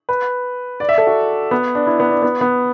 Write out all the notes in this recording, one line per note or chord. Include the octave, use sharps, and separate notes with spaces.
B4
D5
E5
A4
F#4
B3
D4
E4
B3
D4
B3
B3